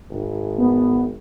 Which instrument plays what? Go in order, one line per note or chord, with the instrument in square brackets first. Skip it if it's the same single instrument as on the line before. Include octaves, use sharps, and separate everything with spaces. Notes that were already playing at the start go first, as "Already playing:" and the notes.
[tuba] G#1
[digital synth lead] B3